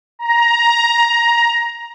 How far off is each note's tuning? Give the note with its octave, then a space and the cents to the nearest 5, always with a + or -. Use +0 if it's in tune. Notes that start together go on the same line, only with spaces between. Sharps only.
A#5 +15